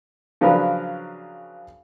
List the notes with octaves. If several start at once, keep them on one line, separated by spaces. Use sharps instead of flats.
C#3 F3 F#3 D4 A#4 B4